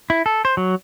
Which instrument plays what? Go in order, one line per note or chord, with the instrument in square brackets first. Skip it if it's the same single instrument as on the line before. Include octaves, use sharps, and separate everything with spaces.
[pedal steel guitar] E4
A4
C5
F#3